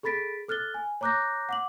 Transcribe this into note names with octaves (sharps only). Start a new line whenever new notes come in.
G#4 A4 B5 A6 B6 D7
A4 F6 F#6 A6 G7
G#5
C#5 A#5 D6 F#6 G6 A#6
F#5 D6 F#7